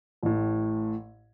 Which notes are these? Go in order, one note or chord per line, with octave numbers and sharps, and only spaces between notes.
A1 A2